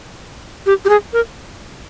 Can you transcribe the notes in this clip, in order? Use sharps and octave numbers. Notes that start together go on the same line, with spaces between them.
G4
G4
G#4
A#4